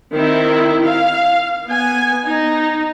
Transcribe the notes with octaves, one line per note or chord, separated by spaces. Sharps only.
D#3 C4 E4
F5
B3 G#5
D#4